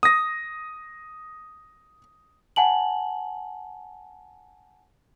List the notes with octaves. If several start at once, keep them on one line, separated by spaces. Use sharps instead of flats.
D#6 A#6
F#5 G#5 A5 F#7